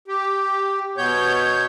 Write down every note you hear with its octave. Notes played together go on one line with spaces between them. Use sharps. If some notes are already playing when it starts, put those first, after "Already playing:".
G4
B2 B3 C#5 G6